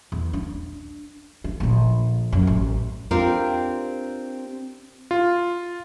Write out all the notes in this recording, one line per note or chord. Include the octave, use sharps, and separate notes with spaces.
E2
D4
D4
A#1 D3
F#2
A1
C4 D4 F4 G4 A#4
F4